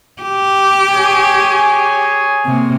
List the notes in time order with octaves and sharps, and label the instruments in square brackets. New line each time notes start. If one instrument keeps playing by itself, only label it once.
[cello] G4
[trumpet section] G#4 C#5 G#5
[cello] C3 A#3